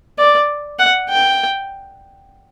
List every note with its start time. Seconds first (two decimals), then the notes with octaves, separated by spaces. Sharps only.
0.19 D5
0.79 F#5
1.09 G5